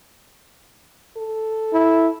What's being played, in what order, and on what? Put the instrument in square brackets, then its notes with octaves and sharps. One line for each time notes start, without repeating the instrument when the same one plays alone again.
[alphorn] A4
[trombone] E4